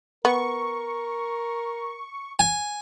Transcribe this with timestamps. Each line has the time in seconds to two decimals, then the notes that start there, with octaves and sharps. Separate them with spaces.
0.25 B3 A#4 C#6
2.39 G#5